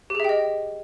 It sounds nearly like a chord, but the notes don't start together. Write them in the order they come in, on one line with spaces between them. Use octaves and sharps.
G4 G#4 E5 G5 D#5